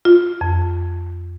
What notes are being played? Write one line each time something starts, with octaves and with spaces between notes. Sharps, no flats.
F4
F2